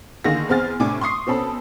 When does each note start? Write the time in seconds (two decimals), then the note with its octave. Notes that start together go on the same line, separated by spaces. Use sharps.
0.24 D3 D#3 A#3 G#4 A#6
0.49 E2 C4 G#4 F6 A6
0.80 A2 C3 D4 G#5 D6
1.01 C6 C#6 D#6 C7
1.27 B2 C4 C#4 A4 B5